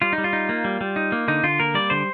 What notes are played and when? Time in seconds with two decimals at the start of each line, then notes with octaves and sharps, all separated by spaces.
0.02 G3 F4
0.13 D#4
0.18 G3
0.24 F4
0.33 D#4
0.49 A#3
0.64 G3
0.81 G3
0.96 D#4
1.12 A#3
1.28 D3 D#4
1.43 D3 F4
1.60 A#3 A#4
1.74 G3 D5
1.90 D3 C5